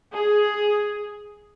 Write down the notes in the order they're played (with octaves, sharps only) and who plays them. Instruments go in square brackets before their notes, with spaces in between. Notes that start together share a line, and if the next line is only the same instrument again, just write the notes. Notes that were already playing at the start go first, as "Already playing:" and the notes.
[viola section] G#4